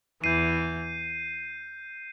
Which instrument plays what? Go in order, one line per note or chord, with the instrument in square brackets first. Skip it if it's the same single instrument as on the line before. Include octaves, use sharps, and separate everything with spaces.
[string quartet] E2 E3 [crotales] G6 C7 D#7